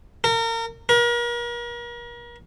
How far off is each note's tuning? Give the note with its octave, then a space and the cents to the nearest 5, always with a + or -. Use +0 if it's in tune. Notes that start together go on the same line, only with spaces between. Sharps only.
A#4 -30
A#4 +40